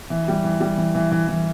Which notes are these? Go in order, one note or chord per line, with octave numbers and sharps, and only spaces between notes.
E3
G3
E3
G3
E3
E3
E3
E3